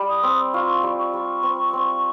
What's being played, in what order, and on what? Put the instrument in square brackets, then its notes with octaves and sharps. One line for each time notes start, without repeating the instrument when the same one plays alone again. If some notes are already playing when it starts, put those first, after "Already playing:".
Already playing: [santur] G3
[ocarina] D#6
[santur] C4
[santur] F4 [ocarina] C#6
[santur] G3
[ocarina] C#6
[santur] G3
C4
C4